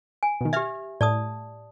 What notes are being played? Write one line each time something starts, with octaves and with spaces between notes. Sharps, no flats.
G#5
B2 D#3
G4 E5 F6 G#6
A2 D5 A5 D#6